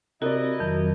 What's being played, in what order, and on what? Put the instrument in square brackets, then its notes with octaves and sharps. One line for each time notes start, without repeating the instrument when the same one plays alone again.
[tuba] C3 [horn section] E4 D#5 [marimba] F#4 [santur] A#4 D5
[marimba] F2 D#3 [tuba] F#3